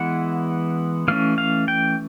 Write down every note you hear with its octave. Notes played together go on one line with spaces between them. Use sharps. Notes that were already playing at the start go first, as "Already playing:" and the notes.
Already playing: E3 G#3 B3 E4 F#5
E3 A3 C#4 F5
F5
G5